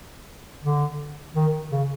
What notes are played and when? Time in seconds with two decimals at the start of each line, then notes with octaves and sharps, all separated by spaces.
0.64 D3
1.36 D#3
1.72 C#3